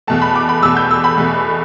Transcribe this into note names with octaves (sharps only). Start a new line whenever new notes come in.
E2 B2 A3 A5
B5
D6
B5
E2 B2 A3 E6
G6
E6
B5
E2 B2 A3